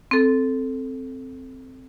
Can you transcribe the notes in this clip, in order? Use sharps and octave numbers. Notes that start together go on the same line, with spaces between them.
C4 A4